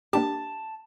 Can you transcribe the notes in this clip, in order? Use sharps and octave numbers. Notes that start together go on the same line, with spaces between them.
A#3 D4 G4 A5